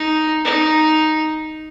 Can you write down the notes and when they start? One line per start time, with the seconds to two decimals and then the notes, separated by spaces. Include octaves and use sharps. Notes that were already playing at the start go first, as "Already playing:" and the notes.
Already playing: D#4
0.44 D#4